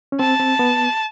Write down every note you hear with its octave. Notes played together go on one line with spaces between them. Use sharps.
C#4
C4 A5
C4
B3